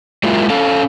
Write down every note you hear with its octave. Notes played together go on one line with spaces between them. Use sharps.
F#3 G#3 A#3 E4 F4
C#4 A4 F5